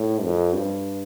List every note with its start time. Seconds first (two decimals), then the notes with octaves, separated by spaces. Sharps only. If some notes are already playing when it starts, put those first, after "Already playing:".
Already playing: A2
0.24 F2
0.54 G2